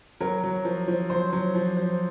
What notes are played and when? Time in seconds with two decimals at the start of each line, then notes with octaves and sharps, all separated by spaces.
0.20 F#3 A#4
0.43 F#3
0.65 F3
0.88 F3
1.10 F#3 C5
1.33 F#3
1.55 F3
1.77 F3